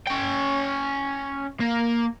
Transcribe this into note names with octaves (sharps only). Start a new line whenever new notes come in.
C#4 G5
A#3